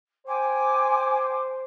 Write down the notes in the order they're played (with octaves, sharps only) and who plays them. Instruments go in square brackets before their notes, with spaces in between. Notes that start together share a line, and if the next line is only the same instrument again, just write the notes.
[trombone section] C5 [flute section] G5 G#5 D6